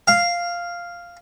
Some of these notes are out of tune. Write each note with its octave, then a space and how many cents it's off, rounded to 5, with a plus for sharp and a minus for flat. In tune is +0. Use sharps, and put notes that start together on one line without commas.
F5 -5